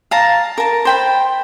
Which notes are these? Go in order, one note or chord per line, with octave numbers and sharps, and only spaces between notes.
F5 A5 A#5
A#4 A5
C5 G5 B5